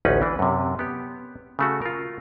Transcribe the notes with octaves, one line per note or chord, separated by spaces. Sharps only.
A1 D2 C#4 D#4 B4
E3 D4
F#2 C3
B3 G4
C#3 A3 F#4
F4 A#4